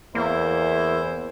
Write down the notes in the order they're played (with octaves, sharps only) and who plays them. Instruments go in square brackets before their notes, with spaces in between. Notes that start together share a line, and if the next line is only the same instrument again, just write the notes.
[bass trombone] E2 [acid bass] A#3 [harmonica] E4 C5